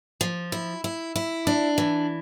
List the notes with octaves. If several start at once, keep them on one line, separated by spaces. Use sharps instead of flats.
F3
E4
E4
E4
D4
E3